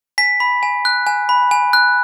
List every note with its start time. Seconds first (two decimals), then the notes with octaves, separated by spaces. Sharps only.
0.18 G#5 B6
0.40 B5
0.63 G#5
0.85 F#6
1.07 G#5
1.29 B5
1.51 G#5
1.73 F#6